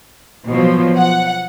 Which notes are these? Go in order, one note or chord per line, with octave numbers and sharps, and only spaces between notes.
B2 F3 F#3
F#5